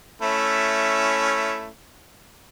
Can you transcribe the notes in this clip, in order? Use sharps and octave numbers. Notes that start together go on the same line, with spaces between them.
A3 C#4 E4